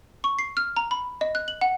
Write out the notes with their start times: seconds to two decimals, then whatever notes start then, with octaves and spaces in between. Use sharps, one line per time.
0.24 C#6
0.39 C7
0.57 F6
0.77 A#5
0.91 B5
1.21 D#5
1.35 F#6
1.48 F#7
1.61 F#5